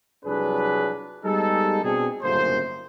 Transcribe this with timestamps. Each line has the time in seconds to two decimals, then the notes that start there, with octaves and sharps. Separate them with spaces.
0.25 C2 F2 F#3 D4 G#4 B4
1.24 G3 G#3 B3 D#4 G#4 A4
1.84 B2 C4 D4 G#4
2.23 G1 F#2 A2 C#3 A#3 C5